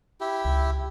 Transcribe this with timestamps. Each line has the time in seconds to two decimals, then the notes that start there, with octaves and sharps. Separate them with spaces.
0.21 E4 G4
0.44 C#2